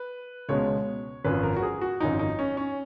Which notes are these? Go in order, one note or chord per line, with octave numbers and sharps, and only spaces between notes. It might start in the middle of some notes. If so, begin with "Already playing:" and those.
Already playing: B4
C#2 B2 G#3 C#5
G#1 F#2 F3 B4
A#4
F#4
G#4
F#4
G#1 F#2 F3 D#4
D#4
C#4
C#4